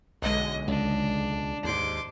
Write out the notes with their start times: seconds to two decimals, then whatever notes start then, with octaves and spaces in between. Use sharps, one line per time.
0.22 B1 D3 G#3 D#5
0.68 C#2 D4
1.64 D#2 G#2 C6 D6